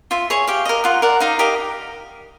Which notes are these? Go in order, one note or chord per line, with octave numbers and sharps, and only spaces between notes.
F4 E5
G#4 C#5
G4 F5
A#4 D#5
F4 F#5
A#4 D5 F#5
D#4 F5
G4 A#4 D#5